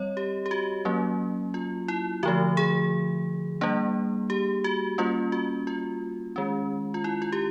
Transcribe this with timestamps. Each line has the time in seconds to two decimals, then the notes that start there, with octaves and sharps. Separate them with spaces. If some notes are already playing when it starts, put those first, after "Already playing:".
Already playing: G3 C4 C#5 D#5
0.17 G4
0.46 G4
0.51 F#4
0.85 F#3 A#3 C#4
1.54 F4
1.88 E4
2.23 D3 F3 A3 F#4
2.57 G#4
3.61 G3 A#3 D4
4.30 G4
4.64 F#4
4.98 G3 A#3 C#4 F4
5.32 F#4
5.67 F4
6.36 D#3 G#3 C#4
6.94 F4
7.04 E4
7.22 F4
7.32 G4